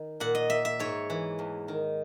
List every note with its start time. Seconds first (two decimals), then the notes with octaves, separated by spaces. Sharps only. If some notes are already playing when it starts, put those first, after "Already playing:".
Already playing: D#3
0.20 A#2 F#5
0.35 D#5
0.50 E5
0.65 E5
0.80 G#2 C#5
1.10 E3
1.39 E2
1.68 D#3